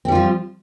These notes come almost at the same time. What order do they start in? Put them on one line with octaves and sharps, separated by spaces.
C4 G3 F4 F3